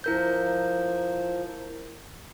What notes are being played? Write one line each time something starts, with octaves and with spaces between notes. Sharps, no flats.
F3 E4 A#4 G6